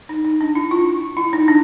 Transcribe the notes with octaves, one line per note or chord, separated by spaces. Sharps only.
D#4
D#4
D4
E4
F4
E4
D#4
D4